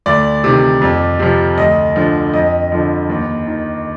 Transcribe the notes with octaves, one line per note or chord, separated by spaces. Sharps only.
D2 D5
C3 D#3
F2
C3 F3
D2 D#5
D3 F3
F2 D#5
D3 F3
D#2
D#3